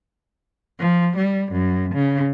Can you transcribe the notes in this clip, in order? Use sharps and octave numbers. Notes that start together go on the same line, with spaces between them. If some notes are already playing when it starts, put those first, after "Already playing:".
F3
G3
F#2
C#3